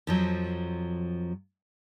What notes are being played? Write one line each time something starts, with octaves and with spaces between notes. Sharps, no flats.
F2 F3 F#3